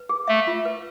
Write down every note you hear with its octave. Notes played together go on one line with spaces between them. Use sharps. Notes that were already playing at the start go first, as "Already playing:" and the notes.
Already playing: B4
G#4
A3 E5
F4
B4